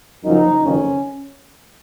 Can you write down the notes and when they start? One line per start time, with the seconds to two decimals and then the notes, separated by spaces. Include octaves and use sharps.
0.24 F#1 F#2 F3 D#4
0.61 F#1 F2 D#3 C#4